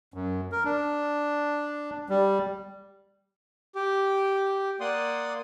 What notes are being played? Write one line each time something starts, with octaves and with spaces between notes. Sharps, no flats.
F#2
A#4
D4
G3
G4
A#3 D5 F#5 C6 D#6